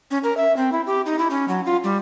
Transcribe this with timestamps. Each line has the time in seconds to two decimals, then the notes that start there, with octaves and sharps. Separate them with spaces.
0.11 C#4
0.23 A#4
0.37 E5
0.57 C4
0.72 E4
0.86 G4
1.06 D#4
1.19 E4
1.30 C#4
1.48 F#3
1.66 F4
1.84 G3